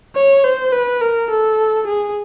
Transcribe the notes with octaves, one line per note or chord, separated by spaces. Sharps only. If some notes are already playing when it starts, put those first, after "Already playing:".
C#5
C5
B4
A#4
A4
G#4